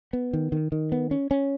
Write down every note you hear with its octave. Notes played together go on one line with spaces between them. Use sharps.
B3
D#3
D#3
D#3
B3
C#4
C#4